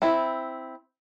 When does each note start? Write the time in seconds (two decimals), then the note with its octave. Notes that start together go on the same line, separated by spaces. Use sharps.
0.02 C4 E4